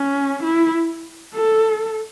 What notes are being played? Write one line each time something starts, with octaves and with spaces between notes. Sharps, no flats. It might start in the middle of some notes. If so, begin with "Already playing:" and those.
Already playing: C#4
E4
A4